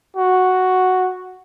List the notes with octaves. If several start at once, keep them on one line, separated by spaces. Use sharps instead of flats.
F#4